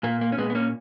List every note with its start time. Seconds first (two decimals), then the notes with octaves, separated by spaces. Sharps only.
0.03 A#2 A#3
0.21 A#3
0.32 C#4
0.38 A#2 G#3 B3
0.50 B3
0.55 A#3 C#4